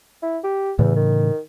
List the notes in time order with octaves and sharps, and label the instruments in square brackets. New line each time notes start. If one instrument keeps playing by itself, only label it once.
[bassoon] E4
G4
[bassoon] E2 [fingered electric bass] A2 C#3 E3
[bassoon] D#3